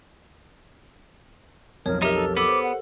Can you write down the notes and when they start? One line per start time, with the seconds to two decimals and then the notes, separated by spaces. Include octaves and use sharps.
1.86 B1 F2 A#4 C#5
2.02 D#4 G4 A#4 E5
2.14 A4
2.37 B3 A4 D6
2.48 C5
2.63 F#5